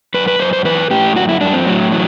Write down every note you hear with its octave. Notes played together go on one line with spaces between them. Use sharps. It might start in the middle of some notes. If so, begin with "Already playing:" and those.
F#2 B4
B4
F#2 C5
C5
E3 B4
A2 G4
F#2 F#4
E4
F#2 D4
C4
A2 F#3
E3 F#3